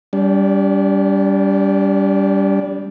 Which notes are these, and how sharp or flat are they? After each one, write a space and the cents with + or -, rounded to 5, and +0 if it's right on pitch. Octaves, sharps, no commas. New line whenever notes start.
G3 +0 D4 -40